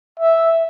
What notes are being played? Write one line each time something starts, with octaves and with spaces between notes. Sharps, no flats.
E5